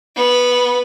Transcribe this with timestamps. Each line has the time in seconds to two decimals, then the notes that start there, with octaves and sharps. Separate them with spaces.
0.16 B3